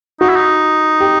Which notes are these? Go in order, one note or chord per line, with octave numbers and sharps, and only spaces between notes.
D#4 F#4
E4
D#4
G4